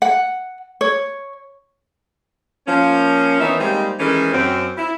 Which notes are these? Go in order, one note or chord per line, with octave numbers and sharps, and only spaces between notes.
F#5
C#5
F3 A#3 C#4
D#3 E3 B3 D#4 C#5 E5
G3 G#3 A#3 C4 D#4
D#3 E3 G#3 A3 C#4
F#2 C4
E4